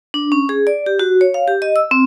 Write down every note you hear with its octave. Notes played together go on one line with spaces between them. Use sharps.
D4
C#4
G#4
D5
G4
F#4
C#5
F5
G4
D#5
E6
C4